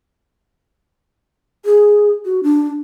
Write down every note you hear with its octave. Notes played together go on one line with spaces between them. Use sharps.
G#4
F#4
D4